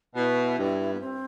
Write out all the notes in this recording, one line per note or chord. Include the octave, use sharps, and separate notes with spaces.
B2 E4
G2
B3
C4